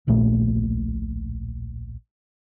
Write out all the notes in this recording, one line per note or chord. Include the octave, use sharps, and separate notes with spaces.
D1 A#1 A#2 A3